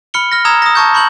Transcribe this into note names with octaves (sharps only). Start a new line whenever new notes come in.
B5 F6 C#7 G7
F6 A#6
A#5 D#6 E6 G#6 E7
D#6 A#6
A5 C#6 G6
B5 C#6 G6 F#7